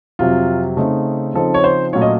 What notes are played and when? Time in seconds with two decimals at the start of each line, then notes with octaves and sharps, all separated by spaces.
0.19 F2 C3 F#3 F4
0.77 C#3 A3 C4 D#4
1.34 C#3 F3 C4 D#4 A4
1.54 C#5
1.64 C5
1.93 A#2 F#3 A3 C#4 F4 C#5
2.02 D#5